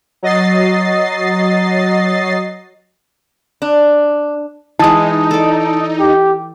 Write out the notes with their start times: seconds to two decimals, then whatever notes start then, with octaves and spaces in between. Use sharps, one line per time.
0.23 F#3 D#5 A6 C7
3.62 D4
4.79 E3 G#3 D#4 A5 D#6
5.31 A4 D5
6.00 G4